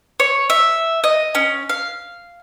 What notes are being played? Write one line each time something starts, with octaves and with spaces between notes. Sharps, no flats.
C#5
E5
D#5
C#4
F5